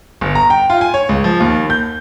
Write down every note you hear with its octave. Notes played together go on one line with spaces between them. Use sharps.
G1
A#5
G5
F4
G#5
C#5
C#2
F3
D#2
G6